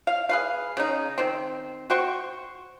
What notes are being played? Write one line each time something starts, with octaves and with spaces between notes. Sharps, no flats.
F5
G#4 B4 F5
C#3 D#4
D#3 C4
F#4 C5 G5 C#6